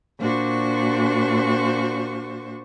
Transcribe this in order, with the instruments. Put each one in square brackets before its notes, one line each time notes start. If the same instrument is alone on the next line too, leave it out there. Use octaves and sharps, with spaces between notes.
[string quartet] A#2 D4 F#4 C5 C#6